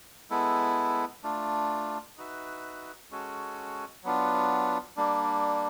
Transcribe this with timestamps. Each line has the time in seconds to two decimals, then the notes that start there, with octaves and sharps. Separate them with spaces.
0.30 G#3 B3 E4 A4
1.24 A3 D4 F4
2.17 D#4 F#4 B4 E5
3.11 G#3 C#4 F#4 A4
4.03 F#3 B3 D4 F4
4.97 G3 A#3 D4